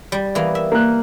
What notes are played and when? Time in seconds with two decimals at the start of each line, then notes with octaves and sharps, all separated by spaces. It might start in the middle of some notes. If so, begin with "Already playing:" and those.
0.12 G3
0.35 E3 A#3 B3
0.55 E5
0.72 A#3 F#6